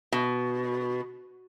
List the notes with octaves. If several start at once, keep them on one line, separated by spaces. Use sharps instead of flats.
B2